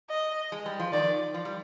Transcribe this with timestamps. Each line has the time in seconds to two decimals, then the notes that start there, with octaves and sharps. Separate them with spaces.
0.10 D#5
0.52 G#3
0.66 G3
0.79 F3
0.92 D#3 D5
1.34 F3
1.45 G3